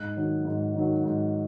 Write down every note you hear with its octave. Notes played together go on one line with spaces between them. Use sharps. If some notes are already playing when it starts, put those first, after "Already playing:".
Already playing: G#2 F#6
D#3 F#3
G#2
D#3 F#3
G#2